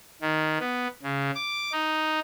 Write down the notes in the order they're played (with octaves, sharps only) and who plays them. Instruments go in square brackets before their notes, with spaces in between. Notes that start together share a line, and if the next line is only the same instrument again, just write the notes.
[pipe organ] D#3
B3
C#3
D6
D#4